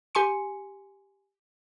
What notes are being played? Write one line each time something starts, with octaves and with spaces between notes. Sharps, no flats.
G4 G#5 C6 C#7